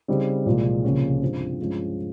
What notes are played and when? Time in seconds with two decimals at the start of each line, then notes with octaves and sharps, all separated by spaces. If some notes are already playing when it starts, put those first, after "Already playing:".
0.08 C#3 G3 C4 D#4
0.46 C2 A#2 F3 G#3
0.84 C#2 C3 F3 A#3 C#4
1.21 G2 F3 C4
1.59 G2 F3 G#3 C#4